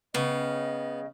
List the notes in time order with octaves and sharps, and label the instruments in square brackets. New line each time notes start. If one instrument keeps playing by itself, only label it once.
[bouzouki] C#3 [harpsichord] B3 [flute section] D#5 G5